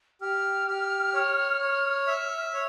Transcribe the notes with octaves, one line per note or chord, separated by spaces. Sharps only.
G4 F6
G4
C#5
C#5
E5
C#5